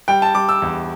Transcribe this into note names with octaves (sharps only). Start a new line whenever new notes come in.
G3 G5
A5
G3 D6
E6
E2